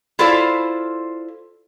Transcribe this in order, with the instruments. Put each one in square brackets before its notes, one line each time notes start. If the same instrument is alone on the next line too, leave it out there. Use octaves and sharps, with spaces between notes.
[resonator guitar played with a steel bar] E4 F4 A4 C5 D5 F5